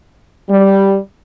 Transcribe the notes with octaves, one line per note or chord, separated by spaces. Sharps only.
G3